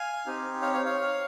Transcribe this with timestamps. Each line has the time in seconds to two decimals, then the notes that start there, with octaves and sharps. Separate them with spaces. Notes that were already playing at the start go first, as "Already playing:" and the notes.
Already playing: F5 G#5
0.26 C4 D#4 G4
0.62 C#5 F5
0.73 C#5 F5
0.85 C#5 F5